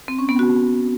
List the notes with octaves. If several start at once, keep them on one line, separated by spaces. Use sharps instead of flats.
C4
C#4
B3
F#4